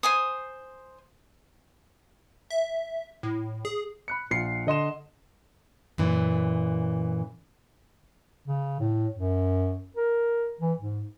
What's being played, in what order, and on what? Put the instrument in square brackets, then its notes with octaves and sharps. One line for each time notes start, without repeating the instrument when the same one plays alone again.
[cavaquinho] C5 G#5 D#6
[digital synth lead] E5
A2
G#4
[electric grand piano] B5 F#6 C#7
A#1 F4 C7 C#7
D3 D#5 C6 E7
[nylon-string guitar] F#2 A#2 E3
[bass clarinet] C#3
A2
F#2
A#4
E3
G#2